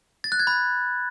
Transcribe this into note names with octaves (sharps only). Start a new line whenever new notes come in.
A6
F#6
G#6
B5